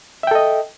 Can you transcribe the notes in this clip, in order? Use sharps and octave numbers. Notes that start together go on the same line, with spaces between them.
A4 D#5 E5 G5